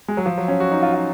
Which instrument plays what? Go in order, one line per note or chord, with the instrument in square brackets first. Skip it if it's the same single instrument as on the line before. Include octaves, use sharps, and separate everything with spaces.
[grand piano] G#3
F#3
F3
F#3
C#4
F#4
D#4
F4
F4